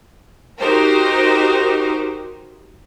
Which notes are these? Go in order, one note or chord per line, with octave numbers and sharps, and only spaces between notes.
D#4 F#4 G4 A#4 C5